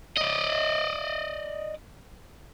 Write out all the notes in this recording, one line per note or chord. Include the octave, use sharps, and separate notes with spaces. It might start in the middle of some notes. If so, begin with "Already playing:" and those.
D5 D#5